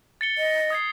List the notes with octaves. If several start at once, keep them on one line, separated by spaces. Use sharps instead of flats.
A6 C#7 G7
D#5
D#6 G#6 C7